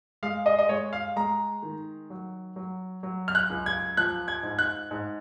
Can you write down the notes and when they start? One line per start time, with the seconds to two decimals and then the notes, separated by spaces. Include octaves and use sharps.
0.23 G#3 F5
0.46 D#5
0.59 D#5
0.69 G#3 C#5
0.93 F5
1.16 G#3 A#5
1.63 D#3
2.10 F#3
2.56 F#3
3.03 F#3
3.28 F6
3.35 F#6
3.50 C#2
3.66 G#6
3.97 F3 F#6
4.28 G#6
4.43 G#2
4.59 F#6
4.91 G#2